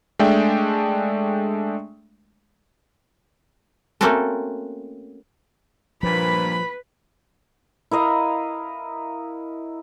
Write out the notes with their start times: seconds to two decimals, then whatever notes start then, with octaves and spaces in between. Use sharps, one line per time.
0.19 G#3 A3 D4 E5 G5
4.01 A3 A#3 C4 C#4 F#4 A4
6.03 G2 A#2 F3 B4 B5
7.91 E4 A#4 D#5 F5